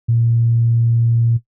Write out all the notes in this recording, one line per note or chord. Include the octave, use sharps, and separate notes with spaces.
A#2